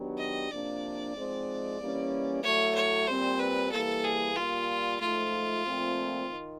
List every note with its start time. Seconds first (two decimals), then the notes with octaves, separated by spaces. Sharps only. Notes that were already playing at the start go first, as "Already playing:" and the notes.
Already playing: D#3 F#3 B3 D4 G4
0.18 D#5
0.50 C3 F3 A#3 D4 D5
1.14 G#2 F3 G#3 C4
1.79 E3 G3 A#3 C#4
2.43 A2 F#3 A3 C#5
2.75 C#5
3.07 A#2 G3 C4 C5
3.39 B4
3.72 E3 G3 A#3 A4
4.04 G#4
4.36 A#2 G3 A#3 F4
5.00 G#2 F3 A3 F4
5.65 A#2 F3 A3 C4
6.29 D#3